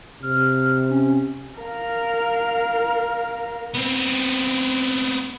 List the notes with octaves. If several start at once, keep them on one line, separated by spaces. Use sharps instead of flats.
C3 F6
C#4
A#4 F5
B3 C4